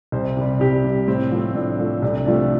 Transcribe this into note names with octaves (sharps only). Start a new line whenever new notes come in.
C2 C5
C3 G3
C2 G4
C3 G3
A2 C4
F3 A3
A2 D4
F3 A3
C2 D4
C3 F3 A3 D4